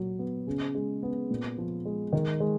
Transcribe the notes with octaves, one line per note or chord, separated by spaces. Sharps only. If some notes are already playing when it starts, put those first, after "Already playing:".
Already playing: A#2 F#3
B3
C#3
G#3
B3
A#2
F3
G#3
D#3
G#3